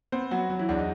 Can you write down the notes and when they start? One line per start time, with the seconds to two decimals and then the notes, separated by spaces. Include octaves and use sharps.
0.12 B3 C4 C5
0.31 F#3 B3 F#4
0.50 F#3
0.59 E3 E4
0.69 E2 D4
0.79 D#4